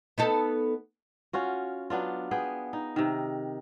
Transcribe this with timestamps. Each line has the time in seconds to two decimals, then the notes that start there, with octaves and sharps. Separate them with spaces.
0.18 B3 D#4 A4
1.33 C#4 F4 F#4
1.90 F#3 B3 D4 F4
2.31 B3 G#4 G5
2.73 D#4
2.96 C3 D#3